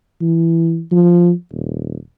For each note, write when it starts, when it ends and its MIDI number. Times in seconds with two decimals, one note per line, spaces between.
0.21 0.82 52
0.91 1.32 53
1.52 1.96 27